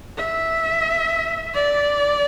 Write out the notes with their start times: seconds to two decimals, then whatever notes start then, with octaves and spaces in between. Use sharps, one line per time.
0.18 E5
1.54 D5